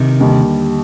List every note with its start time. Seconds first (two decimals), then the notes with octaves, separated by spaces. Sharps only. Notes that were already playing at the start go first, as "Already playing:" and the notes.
Already playing: C3 D#3
0.20 D#2 D3 G3